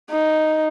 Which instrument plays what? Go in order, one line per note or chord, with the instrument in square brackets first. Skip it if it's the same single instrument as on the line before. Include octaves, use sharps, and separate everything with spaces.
[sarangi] D#4